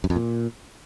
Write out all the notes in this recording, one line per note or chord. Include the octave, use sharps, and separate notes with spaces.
F#2
F2
A#2